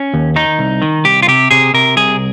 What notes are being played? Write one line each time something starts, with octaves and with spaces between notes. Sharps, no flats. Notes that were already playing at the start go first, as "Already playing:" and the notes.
Already playing: C#4
D#2
D#3 D#4
C2
D#3
C2 G4
F4
C3 G4
C3 G#4
C3 A#4
C2 G#4